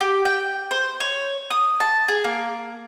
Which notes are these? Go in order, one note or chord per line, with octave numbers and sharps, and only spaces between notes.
G4
G5
C5
C#5
D#6
A5
G#4
A#3